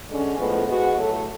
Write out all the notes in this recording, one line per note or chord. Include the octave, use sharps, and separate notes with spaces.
D3 G#3 C#4
A2 F3 G#3 B3
G#3 B3 F#4
A2 F#3 A3